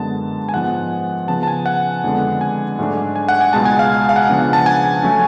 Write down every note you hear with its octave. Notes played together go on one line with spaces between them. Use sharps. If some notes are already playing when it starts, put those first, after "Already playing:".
Already playing: F#2 D3 G#3 B3 A5
G#5
G#2 F3 B3 F#5
C#3 F3 B3 A5
A5
G#5
F#5
F2 D3 G#3 B3 D4
G#5
G#2 F#3 A3 D4
G#5
F#5
G#5
C#2 B2 G#3 A5
G#5
F5
F5
F#5
C#3 F3 B3 D4
A5
G#5
F#3 A3 C#4